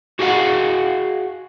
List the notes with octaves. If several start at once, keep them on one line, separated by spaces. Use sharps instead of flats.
F#4 G#4 D#5 F5 F#5